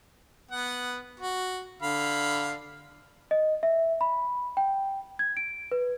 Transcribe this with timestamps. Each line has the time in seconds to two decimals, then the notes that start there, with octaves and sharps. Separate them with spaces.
0.51 B3 F#5
1.20 F#4
1.82 D3 F5 B5
3.31 D#5
3.63 E5
4.01 B5
4.57 G5
5.19 G#6
5.37 D7
5.72 B4